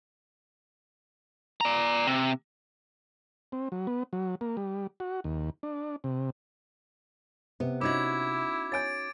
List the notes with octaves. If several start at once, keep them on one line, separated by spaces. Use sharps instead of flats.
D5 A#5
C3
C4
F#3
B3
F#3
A#3
G3
F#4
D#2
D4
C3
C3 B3
C#4 D#4 E4 F#4 D6 G#6
C#5 G#5 G6 A6 D7